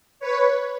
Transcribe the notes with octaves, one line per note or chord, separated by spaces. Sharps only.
B4 C#5